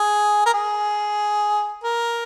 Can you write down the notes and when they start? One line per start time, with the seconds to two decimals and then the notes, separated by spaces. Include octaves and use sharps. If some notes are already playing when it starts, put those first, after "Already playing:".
Already playing: G#4
0.46 A#4
0.54 G#4
1.84 A#4